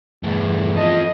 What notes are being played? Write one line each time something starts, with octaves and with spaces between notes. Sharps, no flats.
E2 G2 A3
F3 A4 D#5